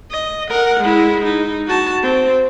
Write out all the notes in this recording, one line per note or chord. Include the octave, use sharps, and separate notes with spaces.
D#5
A#4 F#5
G#3 E4
D#4
F#4 A5
C4